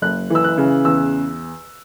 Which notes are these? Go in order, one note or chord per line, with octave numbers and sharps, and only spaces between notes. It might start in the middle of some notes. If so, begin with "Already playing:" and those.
F#1 F#6
E3 E6
F#6
C#3
E2 E6